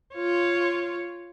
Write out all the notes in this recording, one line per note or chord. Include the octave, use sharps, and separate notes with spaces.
F4 C#5